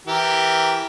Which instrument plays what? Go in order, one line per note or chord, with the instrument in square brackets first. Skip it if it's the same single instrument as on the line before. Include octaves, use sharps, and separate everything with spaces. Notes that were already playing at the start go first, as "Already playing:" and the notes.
[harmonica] E3 G4 A#4